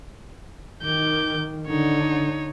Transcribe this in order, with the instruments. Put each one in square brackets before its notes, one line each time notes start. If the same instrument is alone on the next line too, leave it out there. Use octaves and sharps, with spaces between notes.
[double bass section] D#3 [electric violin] D6 G6
[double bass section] D3 [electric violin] D#4 C#5